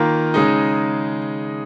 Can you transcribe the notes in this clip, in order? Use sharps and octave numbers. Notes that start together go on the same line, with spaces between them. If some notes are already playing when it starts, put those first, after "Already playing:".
Already playing: D#3 A#3 F4
C#3 G#3 D#4